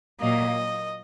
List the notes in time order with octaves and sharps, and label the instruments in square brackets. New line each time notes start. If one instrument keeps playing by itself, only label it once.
[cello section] A#2 F#3 A#3 [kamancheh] D#5